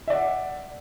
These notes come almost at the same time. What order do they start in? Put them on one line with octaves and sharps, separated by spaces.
E5 D5 F#5